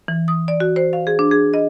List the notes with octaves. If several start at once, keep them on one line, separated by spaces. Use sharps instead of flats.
E3
D#6
D5
F#4
C5
F5
G#4
D4
G#4
D#5